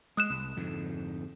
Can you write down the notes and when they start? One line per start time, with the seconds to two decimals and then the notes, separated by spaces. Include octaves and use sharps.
0.17 G#3 D#6 F#6 E7
0.30 C2
0.56 F2 G#2 D3